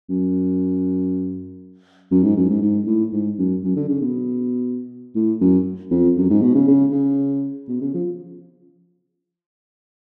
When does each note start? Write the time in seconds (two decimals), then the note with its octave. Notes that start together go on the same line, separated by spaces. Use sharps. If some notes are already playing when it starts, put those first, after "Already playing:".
0.09 F#2
2.11 F#2
2.23 G#2
2.36 F#2
2.50 G#2
2.62 G#2
2.87 A2
3.12 G#2
3.38 F#2
3.63 F#2
3.76 D3
3.89 C#3
4.01 B2
5.15 A2
5.41 F#2
5.91 F2
6.17 F#2
6.30 G#2
6.42 B2
6.54 C#3
6.68 C#3
6.92 C#3
7.68 B2
7.81 C#3
7.94 F3